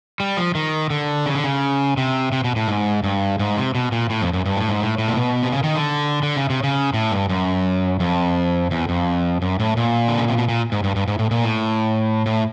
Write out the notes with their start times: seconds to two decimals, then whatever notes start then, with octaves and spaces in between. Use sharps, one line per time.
0.20 G3
0.37 F3
0.55 D#3
0.90 D3
1.26 C#3
1.35 D3
1.44 C#3
1.97 C3
2.32 C3
2.44 B2
2.56 A2
2.68 G#2
3.04 G2
3.39 G#2
3.57 C3
3.75 B2
3.92 A#2
4.10 A2
4.22 F2
4.33 F#2
4.45 G2
4.57 A2
4.69 G#2
4.81 A2
4.98 A2
5.08 A#2
5.16 B2
5.43 C3
5.52 C#3
5.64 D#3
5.76 D3
6.23 D3
6.36 C#3
6.50 C3
6.63 C#3
6.94 A2
7.12 G2
7.29 F#2
8.00 F2
8.71 E2
8.89 F2
9.42 F#2
9.60 A2
9.77 A#2
10.08 D3
10.18 C#3
10.28 C3
10.38 B2
10.49 A#2
10.72 G#2
10.84 G2
10.96 G2
11.08 G#2
11.19 A2
11.31 A#2
11.43 A2
12.26 A2